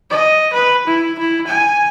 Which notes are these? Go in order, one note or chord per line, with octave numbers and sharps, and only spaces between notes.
D#5
B4
E4
E4
G#5